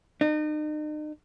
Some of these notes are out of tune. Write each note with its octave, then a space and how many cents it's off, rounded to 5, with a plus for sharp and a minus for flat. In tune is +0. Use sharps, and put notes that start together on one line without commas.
D#4 -40